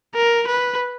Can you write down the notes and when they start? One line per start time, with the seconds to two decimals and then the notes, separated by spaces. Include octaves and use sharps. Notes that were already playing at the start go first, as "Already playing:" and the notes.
0.15 A#4
0.47 B4